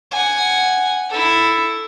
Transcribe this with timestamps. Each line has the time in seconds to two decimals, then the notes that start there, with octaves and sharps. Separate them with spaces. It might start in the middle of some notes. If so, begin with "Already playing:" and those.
0.11 F#5 G#5
1.09 E4 A4